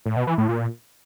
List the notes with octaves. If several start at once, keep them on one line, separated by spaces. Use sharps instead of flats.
A2
B2
E3
A2
A#2